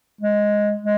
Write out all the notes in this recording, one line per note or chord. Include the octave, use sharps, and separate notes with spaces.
G#3
G#3